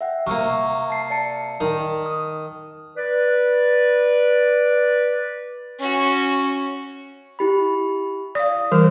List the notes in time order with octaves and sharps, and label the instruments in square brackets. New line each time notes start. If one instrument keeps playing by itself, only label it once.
[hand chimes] E5 F#5 G5
[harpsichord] C3 A#3 [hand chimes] C#6 F6
[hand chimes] A5 C7
D5 A5 C#7
[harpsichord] D#3
[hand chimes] D#6
[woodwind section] B4 D5
[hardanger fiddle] C#4 F#4
[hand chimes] E4 G4 B5
[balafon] D5 F5 [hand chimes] D#6
[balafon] E3 G3 [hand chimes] A#4 C5 F6